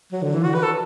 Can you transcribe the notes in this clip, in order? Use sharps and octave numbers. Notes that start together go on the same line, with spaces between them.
F#3
D3
E3
F#4
B4
A4